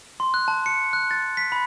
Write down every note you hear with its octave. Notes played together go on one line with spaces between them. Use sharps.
C6
F#6
A5
C#7
F#6
A6
B6
B5